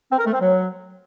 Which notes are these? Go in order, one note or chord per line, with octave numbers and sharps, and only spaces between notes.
C4
A#4
A3
C4
F#3